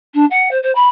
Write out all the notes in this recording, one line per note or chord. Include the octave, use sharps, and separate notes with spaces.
D4
F#5
C5
C5
B5